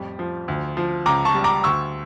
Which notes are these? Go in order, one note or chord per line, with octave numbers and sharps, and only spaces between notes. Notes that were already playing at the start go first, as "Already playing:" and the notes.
Already playing: F2 A2 G3
F3
D2
F3
C#2 A#5 D6
A5 C#6
G3
A#5 D6
D2 C#6 E6